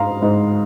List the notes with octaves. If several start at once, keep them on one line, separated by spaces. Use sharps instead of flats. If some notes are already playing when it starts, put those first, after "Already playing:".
Already playing: G#2 G#3 D#4 F5 A#5 C6
G#2 G#3 D#4